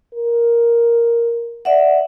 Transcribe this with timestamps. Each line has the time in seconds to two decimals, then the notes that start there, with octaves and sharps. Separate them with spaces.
0.15 A#4
1.65 D5 E5 F#5